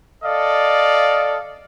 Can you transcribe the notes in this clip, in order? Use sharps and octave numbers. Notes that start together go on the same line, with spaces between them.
A4 D5 D#5 F5